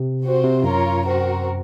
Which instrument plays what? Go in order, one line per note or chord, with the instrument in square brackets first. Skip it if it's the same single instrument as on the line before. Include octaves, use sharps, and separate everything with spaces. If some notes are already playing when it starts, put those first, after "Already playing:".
Already playing: [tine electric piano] C3
[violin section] C4 F#4 C5
[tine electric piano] C3
[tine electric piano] F#2 [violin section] F4 A#4 C#5
[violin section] C4 F#4 A#4